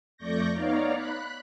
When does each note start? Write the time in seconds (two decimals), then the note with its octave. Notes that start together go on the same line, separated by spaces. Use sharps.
0.17 F2 A3 D5 C#6 G6 A#6
0.52 B3 D#4 C#5 D5 F5 A#5
0.93 B5 F#6